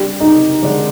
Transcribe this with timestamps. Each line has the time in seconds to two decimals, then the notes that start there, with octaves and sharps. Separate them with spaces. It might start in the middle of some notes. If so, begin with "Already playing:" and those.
Already playing: G3 D4 G4
0.20 D#4
0.63 D3 G#3 D4